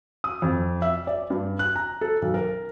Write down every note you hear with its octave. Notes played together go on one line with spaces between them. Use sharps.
D#6
F2
E5
D5
G2
F#6
A#5
A4
B1
A#4